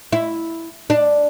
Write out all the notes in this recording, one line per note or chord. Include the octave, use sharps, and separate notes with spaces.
E4
D4